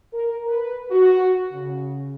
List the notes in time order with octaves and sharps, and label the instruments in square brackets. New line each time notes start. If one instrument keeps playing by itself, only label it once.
[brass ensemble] A#4
B4
F#4
C#3